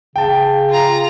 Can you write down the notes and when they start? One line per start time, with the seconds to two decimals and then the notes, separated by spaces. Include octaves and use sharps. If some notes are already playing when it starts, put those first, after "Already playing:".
0.16 C#3 G5 A5
0.69 F4 A#5